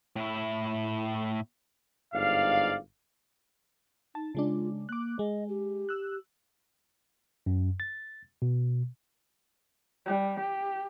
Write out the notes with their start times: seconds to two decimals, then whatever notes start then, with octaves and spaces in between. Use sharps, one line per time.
0.16 A2 E4
2.14 G1 G#2 D5 F5
4.15 D#4 A5
4.35 C#3 G#3 D4 F4
4.89 A#3 D6 F#6
5.19 G#3 D#5
5.49 G4
5.89 E6 F#6
7.46 F#2
7.80 A6
8.42 B2
10.06 G3
10.40 G4